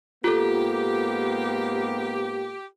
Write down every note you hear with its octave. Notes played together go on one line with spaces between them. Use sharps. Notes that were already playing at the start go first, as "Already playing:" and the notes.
G#2 A#3 B3 F4 G4 A4